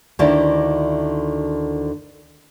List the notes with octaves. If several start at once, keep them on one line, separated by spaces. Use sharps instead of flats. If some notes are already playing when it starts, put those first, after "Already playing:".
D2 D3 D#3 E4 D5